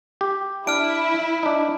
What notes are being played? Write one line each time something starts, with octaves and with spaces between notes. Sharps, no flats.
G4
D4 E4 F6 D7
D4 D#4